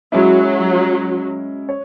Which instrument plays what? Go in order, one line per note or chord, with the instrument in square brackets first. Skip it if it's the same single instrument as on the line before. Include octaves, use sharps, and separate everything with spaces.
[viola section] F#3 [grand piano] G#3 C#4 E4
[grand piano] C#5